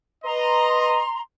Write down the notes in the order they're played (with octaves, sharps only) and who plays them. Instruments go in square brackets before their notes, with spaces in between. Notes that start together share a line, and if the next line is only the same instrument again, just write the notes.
[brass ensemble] B4 D#5 [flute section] A#5 C6